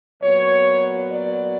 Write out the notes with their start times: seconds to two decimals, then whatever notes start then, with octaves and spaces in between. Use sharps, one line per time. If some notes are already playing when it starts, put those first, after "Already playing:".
0.22 A#2 F#3 B3 C#5
1.10 D5